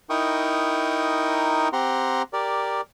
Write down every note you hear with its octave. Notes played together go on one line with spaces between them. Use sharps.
D#4 E4 A#4 G5 C#6 D#6
C4 G4 F#5 A#5 C6
G4 A#4 D5